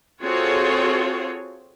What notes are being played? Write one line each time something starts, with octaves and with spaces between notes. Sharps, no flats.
C4 F4 F#4 G#4 A4 C#5